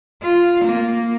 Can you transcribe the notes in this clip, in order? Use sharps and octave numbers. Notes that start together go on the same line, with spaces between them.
F4
A#3